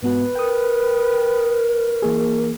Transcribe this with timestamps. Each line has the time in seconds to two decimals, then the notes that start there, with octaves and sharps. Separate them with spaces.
0.03 G#2 B3 F#4 B4
0.35 A#4 G5 D#6
2.02 E3 A#3 G#4